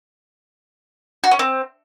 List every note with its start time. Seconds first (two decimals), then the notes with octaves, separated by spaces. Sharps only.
1.24 F#4
1.31 C#4
1.39 C4